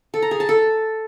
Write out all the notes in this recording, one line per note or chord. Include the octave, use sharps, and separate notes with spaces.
A4
A#5
G#4
A5
A4